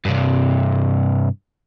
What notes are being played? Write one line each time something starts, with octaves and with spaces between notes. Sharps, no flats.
G2 C3